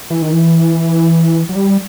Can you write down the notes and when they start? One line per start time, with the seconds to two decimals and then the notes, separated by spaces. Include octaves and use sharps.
0.10 E3
0.22 D#3
0.32 E3
1.49 F#3
1.56 G3